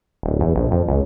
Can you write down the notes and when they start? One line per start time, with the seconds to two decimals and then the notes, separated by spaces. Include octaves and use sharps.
0.23 D1
0.40 E2
0.55 A#1
0.71 F2
0.89 C#2